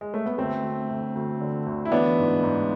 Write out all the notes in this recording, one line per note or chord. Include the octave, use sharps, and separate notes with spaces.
G#3
A3
B3
D2 A3 C4
D2
D2
D2
D3
D2
E4
E3 B3 D4
G#2
G#2